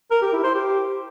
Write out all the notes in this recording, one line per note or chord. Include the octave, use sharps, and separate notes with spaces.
A#4
G4
E4
C5
G4